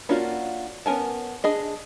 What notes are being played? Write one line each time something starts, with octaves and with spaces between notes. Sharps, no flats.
A#3 C#4 D4 F4 F#4
B3 C#4 A#4 G#5 A5
D4 G#4 D#5